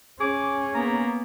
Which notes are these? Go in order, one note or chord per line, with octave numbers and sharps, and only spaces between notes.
C#4 G#4 D6
A#3 B3 A#5